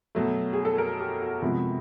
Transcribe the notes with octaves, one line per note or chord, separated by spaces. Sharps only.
B2 F#3 A3
G#4
A4
A#4
G4
F#4
C3 F3 G#3 B3